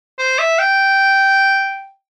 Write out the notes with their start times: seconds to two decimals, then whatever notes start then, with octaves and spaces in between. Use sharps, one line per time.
0.19 C5
0.39 E5
0.59 G5